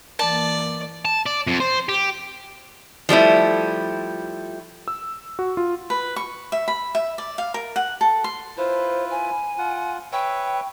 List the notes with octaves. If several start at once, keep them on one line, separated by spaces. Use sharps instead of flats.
E3 A#3 D5 A5
A5
D5
F2
C5
G4
F3 G3 A3 E4
E6
F#4
F4
B4
C#6
E5
B5
E5
D5
F5
A#4
F#5
A4
C6
E4 F4 B4 C5
G#5
F4 F#5
B4 C#5 E5 G5